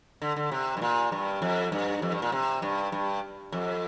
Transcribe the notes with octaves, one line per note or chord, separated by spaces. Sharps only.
D3
D3
C3
G2
A#2
G2
F2
G2
F2
G2
A#2
C3
G2
G2
F2